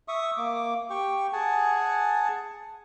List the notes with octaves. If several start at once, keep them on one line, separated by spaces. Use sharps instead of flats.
E5 C#6 D#6
A#3 D6
G4 G5 C#6
G#4 F#5 G#5 A5